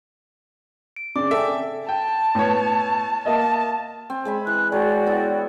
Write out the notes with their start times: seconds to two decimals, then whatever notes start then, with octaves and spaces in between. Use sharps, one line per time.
0.96 D7
1.16 C#3 C4 D5 D6
1.31 A4 E5 G5 G#5
1.88 G5 A5
2.35 A2 B3 C#5
3.25 A#3 D#5 E5 A5
4.10 C4
4.25 G#3 E5 B5
4.47 E3 F#6
4.72 G#3 F#4 C#5 D5 G5 A#5
5.06 B3 E4